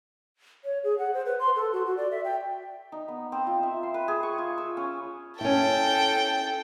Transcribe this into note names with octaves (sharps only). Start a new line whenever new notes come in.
C#5
G#4
F#5
C5
B4
C6
A4
F#4
F#4
D5
E5
G5
D#4
B3
C4
F4
E5
C6
B4
G#4
C#6
F4
E6
C#4
C#4 E4 A4 G5